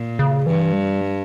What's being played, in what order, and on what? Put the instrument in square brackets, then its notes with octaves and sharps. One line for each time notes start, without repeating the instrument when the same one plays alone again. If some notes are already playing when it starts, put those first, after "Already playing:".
Already playing: [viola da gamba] A#2
[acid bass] C#3
[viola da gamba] G2 [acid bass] E3
[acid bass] G3